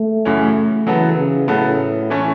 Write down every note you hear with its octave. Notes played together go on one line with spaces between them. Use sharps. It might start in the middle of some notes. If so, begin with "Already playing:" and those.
Already playing: A3
F#2 C#3 E3 C#4
C#3 E3 F#3 B3 A4
C#3
A2 C#3 F#3 B3 A4
E3 A3 C#4